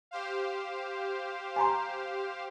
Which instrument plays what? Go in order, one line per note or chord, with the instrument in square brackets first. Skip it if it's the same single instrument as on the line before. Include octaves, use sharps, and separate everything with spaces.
[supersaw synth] G4 C5 F5
[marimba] G#5 A#5 C6